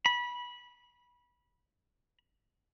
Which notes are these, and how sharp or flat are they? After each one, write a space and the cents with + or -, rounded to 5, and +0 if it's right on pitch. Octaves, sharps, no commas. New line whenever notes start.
B5 -20